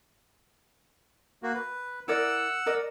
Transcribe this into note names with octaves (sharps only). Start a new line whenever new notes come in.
A#3 F#4
B4
E4 A#4 D5 F#5 E6
A#4 D5 D#5